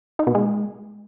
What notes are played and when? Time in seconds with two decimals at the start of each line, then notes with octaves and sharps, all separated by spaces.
0.19 D#4
0.27 B2
0.35 G#3